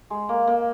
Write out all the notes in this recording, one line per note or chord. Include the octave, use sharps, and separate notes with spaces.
G#3
A#3
A#3